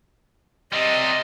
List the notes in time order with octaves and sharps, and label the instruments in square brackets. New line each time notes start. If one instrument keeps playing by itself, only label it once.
[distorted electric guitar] C3 G3 [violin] D#5